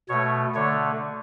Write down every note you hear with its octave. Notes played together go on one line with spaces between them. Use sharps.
B2 A3 C#5
D3 A3 C#5